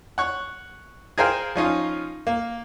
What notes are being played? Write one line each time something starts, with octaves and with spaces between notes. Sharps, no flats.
C#5 F#5
G#4 A#4 C5 F5 G5
F3 C#4 D#4 F4
A#3